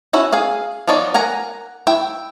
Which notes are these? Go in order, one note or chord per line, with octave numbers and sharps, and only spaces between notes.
C#4 E4 F#4
G#4 F5 G#5
F3 B3 D#4 C#5 D5
A#4 F#5 G#5 A#5
E4 E5 G5